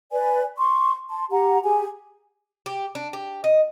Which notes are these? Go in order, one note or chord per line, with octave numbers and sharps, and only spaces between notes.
B4 D5 G#5
C6 C#6
A5 C6
G4 F#5 A#5
G4 G#4 G#5
G4
D4
G4
D#5